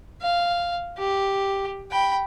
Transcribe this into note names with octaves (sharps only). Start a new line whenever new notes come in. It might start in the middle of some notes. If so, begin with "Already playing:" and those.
F5
G4
G5 B5